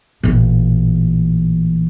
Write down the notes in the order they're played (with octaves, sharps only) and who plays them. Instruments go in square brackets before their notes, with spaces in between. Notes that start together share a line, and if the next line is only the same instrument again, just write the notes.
[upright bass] A1 A#2